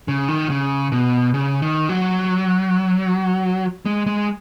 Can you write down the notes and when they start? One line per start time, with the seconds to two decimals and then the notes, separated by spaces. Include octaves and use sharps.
0.08 C#3
0.28 D#3
0.50 C#3
0.92 B2
1.34 C#3
1.62 D#3
1.89 F#3
3.86 G#3
4.06 G#3